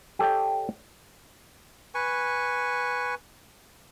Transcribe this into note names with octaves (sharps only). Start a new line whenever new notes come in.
G4 A4 C#5 D#5 G5
B4 G#5 C#6